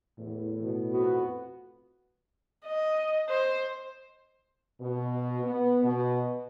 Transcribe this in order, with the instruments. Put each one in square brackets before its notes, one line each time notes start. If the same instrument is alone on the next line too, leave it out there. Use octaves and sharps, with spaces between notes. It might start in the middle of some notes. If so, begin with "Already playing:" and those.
[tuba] E2 [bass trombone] A2
[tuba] B2
[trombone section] F2 B3 [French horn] F#4
[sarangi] D#5
C5
[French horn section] B2
B3
B2